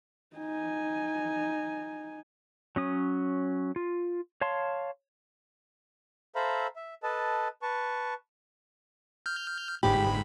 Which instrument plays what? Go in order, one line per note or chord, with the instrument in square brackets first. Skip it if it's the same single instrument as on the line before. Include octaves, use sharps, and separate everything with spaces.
[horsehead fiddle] D#4 G#5
[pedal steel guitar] F#3 C#4 D#6
F4
C#5 F5 A5 C6
[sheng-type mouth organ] A4 C5 E5 F5 A#5 B5
E5
A4 B4 D#5 A5
B4 A5 C#6
[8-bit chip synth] F6 G6
[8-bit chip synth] G1 G#2 B5 [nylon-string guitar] G4